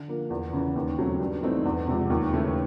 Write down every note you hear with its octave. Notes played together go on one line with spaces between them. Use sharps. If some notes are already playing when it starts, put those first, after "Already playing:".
Already playing: D3
F3 A#3
E2
C#3 E3
D#2
C#3 F#3 A3 C4
G2
E3 A3 C4 D#4
E2
C3 F3 G#3
D#2
C#3 E3 A3 C#4